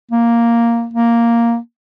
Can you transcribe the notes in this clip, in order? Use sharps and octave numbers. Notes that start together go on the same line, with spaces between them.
A#3
A#3